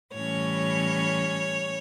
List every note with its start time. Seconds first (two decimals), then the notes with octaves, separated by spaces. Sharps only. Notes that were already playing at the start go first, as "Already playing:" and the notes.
0.13 A2 E3 G3 C#4 C#5